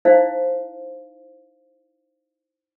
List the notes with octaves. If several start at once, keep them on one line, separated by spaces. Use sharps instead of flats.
D#4 E4 C5 F5